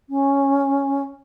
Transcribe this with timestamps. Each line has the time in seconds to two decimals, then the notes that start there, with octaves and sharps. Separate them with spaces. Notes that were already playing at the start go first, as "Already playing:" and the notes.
0.09 C#4